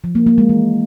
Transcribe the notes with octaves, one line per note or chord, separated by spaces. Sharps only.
F3
A#3
A#3
G#3
E3